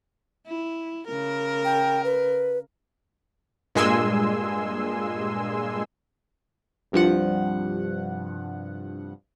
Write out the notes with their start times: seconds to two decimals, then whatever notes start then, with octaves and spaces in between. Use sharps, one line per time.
0.47 E4
1.07 C#3 A#4
1.65 G5
2.04 B4
3.75 G2 A#2 G#3 G#5 C6 E6
6.92 C2 G2 F3 F#5